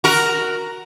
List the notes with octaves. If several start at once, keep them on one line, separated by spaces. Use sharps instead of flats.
F#4 A#4